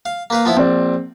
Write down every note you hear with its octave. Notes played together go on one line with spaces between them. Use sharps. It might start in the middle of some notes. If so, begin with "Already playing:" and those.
F5
A#3 B4 F5
F3 B3 E4
A#1 C4 D5